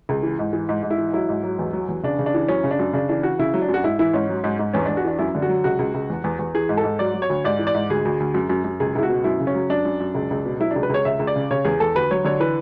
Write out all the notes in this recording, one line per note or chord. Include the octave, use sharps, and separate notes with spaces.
C#2
E3
G#2
E3
G#2
G#2
E4
E3
F#3 E4
G#2
F#3
E2
F#3
E2
C#3 D4
C#3
D4
E3
F#2 C#4
C#3
D4
F#2
C#3 D4
E3 D4
E3 F#4
C#3 E4
F#3
D4
F#2
F#4
G#2 E4
E3 E4
G#2 C#4
F#3
G#2
G#2
E2 C#4
E2 D4
F#4
E3 D4
F#2 E4
D3
F#4
F#3
C#2 F#4
C#2
C#2
E2
E2
E2
E3 G#4
G#2
A4
G#2
F#3 D5
F#3
C#5
D2
G#2 D5
E3
D5
G#2
D2 G#4
D2
D2
F#2
F#2
F#2
C#2 G#4
C#2 E4
F#4
B2
F#2 E4
C#3
C#4
F#3
F#2 D4
F#2
F#2
C#2
C#2
B2
F#3 E4
C#2 D4
B4
C#2 C#5
C#2 E5
C#2
D5
C#3
C#3 C#5
E2 G#4
E2 A4
D2 B4
F#3 C#5
D3 C#5
E3 B4